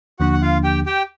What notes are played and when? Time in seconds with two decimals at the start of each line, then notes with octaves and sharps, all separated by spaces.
0.19 D#2 D3 F3 A#3 D4 F#4 F#5
0.33 F#5
0.42 F4 F5
0.64 G4 G5
0.86 G4 G5